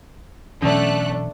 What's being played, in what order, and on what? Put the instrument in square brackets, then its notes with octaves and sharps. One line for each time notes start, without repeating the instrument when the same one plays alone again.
[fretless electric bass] B2 E3 F#3 [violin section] A3 F#6 [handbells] C#4 [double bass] D4